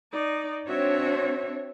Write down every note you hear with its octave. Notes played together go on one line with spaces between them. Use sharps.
D#4 D5
C4 D4 F#4 C#5 E5